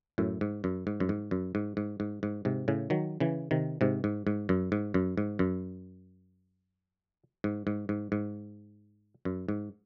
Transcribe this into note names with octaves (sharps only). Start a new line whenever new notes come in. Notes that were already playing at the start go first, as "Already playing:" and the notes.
F#2 A2
G#2
F#2
G#2
F#2
G#2
F#2
G#2
G#2
G#2
G#2
G#2 C3
A2 C#3
D#3 F#3
C#3 E3
C3 D#3
G#2 C3
G#2
G#2
F#2
G#2
F#2
G#2
F#2
G#2
G#2
G#2
G#2
F#2
G#2